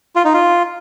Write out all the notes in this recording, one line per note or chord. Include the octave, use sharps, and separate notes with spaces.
F4
D#4
F4